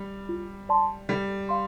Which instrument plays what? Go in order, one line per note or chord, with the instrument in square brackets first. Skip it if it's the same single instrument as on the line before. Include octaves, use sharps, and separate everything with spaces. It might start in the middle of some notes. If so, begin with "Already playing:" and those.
Already playing: [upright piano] G3
[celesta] F4
D5 A5 C6
[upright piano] G3 [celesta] A4
[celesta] F5 C6